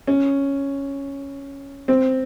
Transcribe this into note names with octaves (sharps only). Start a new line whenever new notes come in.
C#4
C4